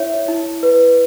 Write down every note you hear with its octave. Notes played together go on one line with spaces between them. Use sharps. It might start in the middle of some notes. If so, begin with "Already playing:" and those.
Already playing: E4 C#5 E5
E4
B4